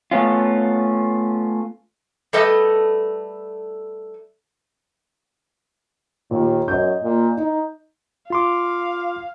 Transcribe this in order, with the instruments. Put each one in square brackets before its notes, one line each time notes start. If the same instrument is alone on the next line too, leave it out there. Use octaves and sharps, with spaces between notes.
[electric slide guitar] A3 B3 C#4 F4
[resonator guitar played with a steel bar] G3 A3 A4 B4 D#5
[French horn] D#2 [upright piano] A#2
[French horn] F#2 [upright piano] D#5 G6
[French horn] A#2
D#4
[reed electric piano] F4 C6 D6 [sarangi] F5